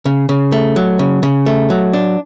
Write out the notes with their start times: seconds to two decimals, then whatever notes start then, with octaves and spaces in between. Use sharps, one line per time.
0.05 C#3
0.29 C#3
0.52 A3
0.76 F#3
0.99 C#3
1.23 C#3
1.46 A3
1.70 F#3
1.93 D4